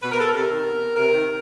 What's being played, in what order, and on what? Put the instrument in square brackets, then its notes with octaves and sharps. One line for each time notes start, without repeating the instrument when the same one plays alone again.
[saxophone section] B2 B4
A#4
A4
C3 A#4
D#3
B2
C3 A#4
D#3